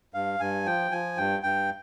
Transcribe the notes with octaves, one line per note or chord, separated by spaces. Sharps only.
G2 F5
G2 G#5
F3 G5
F3 G#5
G2 G5
G2 G5